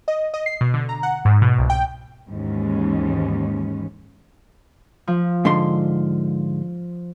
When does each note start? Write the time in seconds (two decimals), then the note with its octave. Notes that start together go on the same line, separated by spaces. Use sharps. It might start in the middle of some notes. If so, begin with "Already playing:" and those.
0.08 D#5
0.34 D#5
0.46 C7
0.61 B2
0.74 D3
0.89 A#5
1.03 F#5
1.25 G#2
1.42 B2
1.59 C2
1.70 G5
2.28 D#2 G#2 E3 C#4
5.07 F3
5.45 G#2 D3 C6